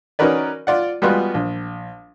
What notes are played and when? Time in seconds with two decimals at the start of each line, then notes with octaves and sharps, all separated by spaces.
0.19 C#4 D#4 F#4 A#4 B4 D5
0.67 F4 D5 F#5
1.02 G3 G#3 B3 F4 F#4
1.34 A#1